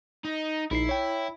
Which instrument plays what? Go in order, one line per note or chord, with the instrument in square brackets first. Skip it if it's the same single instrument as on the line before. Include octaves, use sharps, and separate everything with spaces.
[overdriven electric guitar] D#4
[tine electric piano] A#1 D#4 C7 [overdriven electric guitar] E4
[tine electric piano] C#5 G5